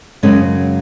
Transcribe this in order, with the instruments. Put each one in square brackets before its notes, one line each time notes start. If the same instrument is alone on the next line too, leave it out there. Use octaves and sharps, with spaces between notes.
[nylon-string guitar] F#2 C#3 F#3 G#3 C#4